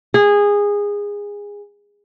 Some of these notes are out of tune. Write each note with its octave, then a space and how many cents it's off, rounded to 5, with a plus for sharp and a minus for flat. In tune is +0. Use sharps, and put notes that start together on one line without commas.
G#4 -20